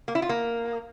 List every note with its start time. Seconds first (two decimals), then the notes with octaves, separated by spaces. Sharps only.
0.08 A#3
0.15 E4
0.22 F4
0.29 A#3